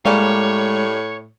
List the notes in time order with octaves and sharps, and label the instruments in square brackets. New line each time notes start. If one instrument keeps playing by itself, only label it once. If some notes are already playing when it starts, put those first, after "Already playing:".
[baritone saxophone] A2 [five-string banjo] G3 A#3 G#5 [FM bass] G#3 [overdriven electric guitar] C#5